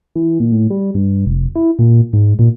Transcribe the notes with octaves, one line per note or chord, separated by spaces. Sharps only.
E3
A#2
A2
G3
G2
F1
E4
A#2
G#2
A#2